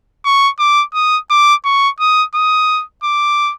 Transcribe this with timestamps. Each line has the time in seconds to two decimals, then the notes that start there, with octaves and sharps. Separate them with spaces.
0.25 C#6
0.59 D6
0.94 D#6
1.30 D6
1.65 C#6
2.00 D#6
2.35 D#6
3.04 D6